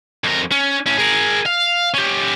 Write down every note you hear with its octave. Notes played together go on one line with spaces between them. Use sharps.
F2 A#4
C#4
A2 C#4
G#4 A#4
F5
C#4 G4